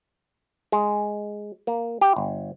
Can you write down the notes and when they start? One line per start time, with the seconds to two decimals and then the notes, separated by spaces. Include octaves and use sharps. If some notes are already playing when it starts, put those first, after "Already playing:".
0.72 G#3
1.67 A#3
2.01 G4
2.16 G1